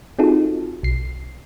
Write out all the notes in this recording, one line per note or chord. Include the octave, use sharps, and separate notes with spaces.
C4 D#4 F4 F#4 G#4 A4
B1 C7